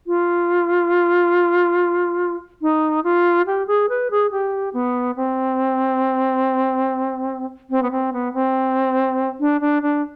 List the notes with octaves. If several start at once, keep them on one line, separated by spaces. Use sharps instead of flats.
F4
D#4
F4
G4
G#4
B4
G#4
G4
B3
C4
C4
B3
C4
B3
C4
D4
D4
D4